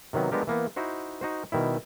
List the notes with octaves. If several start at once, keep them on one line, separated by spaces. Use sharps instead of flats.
C3 D#3 F#3 B3
F3 G#3 B3 D4 G4 A#4
E3 A#3 B3
D#4 E4 F#4 C5
D#4 F#4 C5
B2 D#3 G3 E4